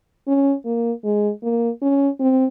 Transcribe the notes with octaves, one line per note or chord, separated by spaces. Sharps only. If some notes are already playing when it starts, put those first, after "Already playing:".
C#4
A#3
G#3
A#3
C#4
C4